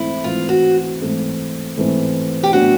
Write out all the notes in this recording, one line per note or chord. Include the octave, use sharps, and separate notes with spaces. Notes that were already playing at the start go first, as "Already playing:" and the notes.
Already playing: G#2 E3 A3 C4 E4
G#2 E3 A3 C4 F4
F#4
G#2 E3 A3 C4
G#2 E3 A3 C4
G4
A2 F#3 B3 D4 F#4